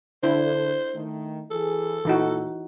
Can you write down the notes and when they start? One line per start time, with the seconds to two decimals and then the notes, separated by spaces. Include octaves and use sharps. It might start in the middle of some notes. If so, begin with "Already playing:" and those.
0.23 D3 D4 E4 C5
0.94 D#3 A3
1.51 E3 G#4 A4
2.05 A#2 E3 D#4 F#4